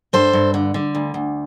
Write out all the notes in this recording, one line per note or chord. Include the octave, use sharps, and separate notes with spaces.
G2 A4 C5
G2
D3
D3
D2
D2